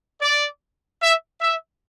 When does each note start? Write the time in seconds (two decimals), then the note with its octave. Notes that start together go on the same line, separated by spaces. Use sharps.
0.21 D5
1.01 E5
1.41 E5